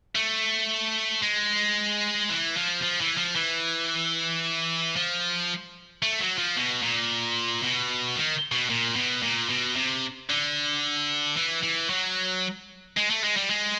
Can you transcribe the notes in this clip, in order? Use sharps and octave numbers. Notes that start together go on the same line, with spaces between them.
A3
G#3
E3
F3
F3
E3
F3
E3
F3
A3
F#3
F3
B2
A#2
B2
D#3
B2
A#2
B2
A#2
B2
C3
D3
E3
E3
F#3
G#3
A3
G#3
G3
G#3